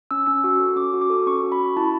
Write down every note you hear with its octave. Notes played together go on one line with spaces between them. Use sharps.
C#4 E6
C#4 E6
F#4
A4
C#4 D6
F#4
D6
A4
C#4 C#6
F#4
B5
C#4
E4 A5